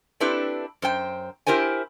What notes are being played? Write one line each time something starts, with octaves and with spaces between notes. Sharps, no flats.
C4 D4 E4 G4 A4 B4
F#2 C5 G5
E4 G4 A#4 C5 G#5